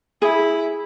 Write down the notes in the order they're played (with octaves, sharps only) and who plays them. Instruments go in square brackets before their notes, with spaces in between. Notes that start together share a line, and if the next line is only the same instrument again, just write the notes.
[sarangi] E4 [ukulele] G#4